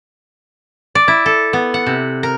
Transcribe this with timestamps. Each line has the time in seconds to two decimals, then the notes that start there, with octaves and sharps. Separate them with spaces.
0.95 D5
1.08 E4
1.26 A4
1.53 B3
1.74 F#5
1.86 C3
2.23 A#4